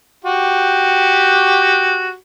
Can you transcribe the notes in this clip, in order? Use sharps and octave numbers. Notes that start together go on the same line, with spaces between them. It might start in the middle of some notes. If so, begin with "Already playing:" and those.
F#4 G4